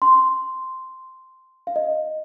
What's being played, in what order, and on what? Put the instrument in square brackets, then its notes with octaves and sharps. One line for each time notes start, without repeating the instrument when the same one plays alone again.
[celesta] C6
F5
D#5